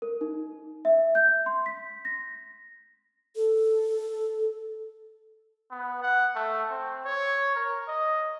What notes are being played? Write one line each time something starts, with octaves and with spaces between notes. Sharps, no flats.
A#4
D#4
E5
G6
C6
B6
A#6
A4
B3
F#5
A3
C4
C#5
A#4
D#5